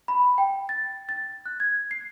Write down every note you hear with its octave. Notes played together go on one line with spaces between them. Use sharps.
B5
G5
A6
A6
F#6
G#6
C7